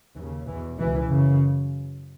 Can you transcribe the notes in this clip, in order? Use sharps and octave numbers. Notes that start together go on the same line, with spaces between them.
D#2 C#3 E3
E2 B2 E3
C#2 B2 E3
F#2 C#3